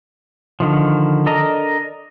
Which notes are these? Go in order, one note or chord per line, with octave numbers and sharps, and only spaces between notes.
D3 D#3 F3
D4 A4 A#4 D#5 A#5